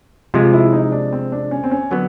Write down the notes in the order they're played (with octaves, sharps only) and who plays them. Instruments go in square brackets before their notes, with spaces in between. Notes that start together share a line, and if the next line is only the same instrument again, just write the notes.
[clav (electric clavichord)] C3 F3 G#3 [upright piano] F4
[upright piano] E4
D#4
D4
C4
D4
C#4
C4
C#4
[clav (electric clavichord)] D3 F#3 B3